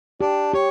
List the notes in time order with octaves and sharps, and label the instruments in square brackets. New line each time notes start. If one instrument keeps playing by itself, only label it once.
[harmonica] D4 [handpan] G4
[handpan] G4 [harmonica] C#5